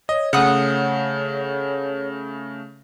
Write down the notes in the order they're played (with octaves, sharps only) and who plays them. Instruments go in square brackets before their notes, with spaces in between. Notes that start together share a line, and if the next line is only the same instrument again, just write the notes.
[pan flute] C#5 [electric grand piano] D#5
[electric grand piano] C#3 A3 [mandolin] F#5 D#6